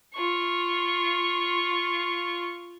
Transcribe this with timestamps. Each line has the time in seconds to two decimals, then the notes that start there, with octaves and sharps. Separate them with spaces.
0.14 F4 C#6